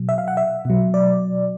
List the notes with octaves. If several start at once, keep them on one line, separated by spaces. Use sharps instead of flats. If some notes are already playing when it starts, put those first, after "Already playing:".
Already playing: B2 F#3
E5
F5
F#5
E5
B2 F#3
D5